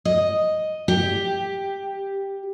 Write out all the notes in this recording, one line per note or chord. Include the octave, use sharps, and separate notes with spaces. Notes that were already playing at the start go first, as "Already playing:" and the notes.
D#5
G4